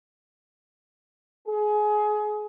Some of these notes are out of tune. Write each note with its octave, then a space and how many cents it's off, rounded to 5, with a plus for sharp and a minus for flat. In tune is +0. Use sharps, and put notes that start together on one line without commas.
G#4 +25